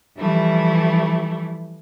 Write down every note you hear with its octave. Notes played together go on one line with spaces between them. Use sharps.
E3 F3 G3 A3 E4